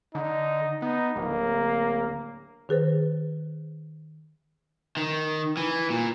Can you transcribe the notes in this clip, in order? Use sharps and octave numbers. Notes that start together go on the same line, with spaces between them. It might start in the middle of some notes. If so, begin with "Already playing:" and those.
D3 D#4
B3 D#4
D1 A#3
D#3 G#4 B4 C5
D#3
E3
A#2